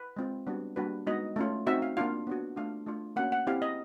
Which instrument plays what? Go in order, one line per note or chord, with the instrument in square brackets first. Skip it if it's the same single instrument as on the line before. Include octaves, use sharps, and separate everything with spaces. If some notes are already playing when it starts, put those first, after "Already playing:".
Already playing: [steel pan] B4
G#3 C4 F4
G3 B3 D4 F#4
G3 A#3 D4 F#4 B4
G#3 B3 D#4 F#4 D#5
A3 C#4 F4
C4 D#4 F#4 E5
F5
A#3 D4 F4 F5
B3 D4 F#4
A3 D4 F4 F5
A3 D4 F4
A#3 C#4 F#4 F#5
F#5
C4 E4 G4 F5
D#5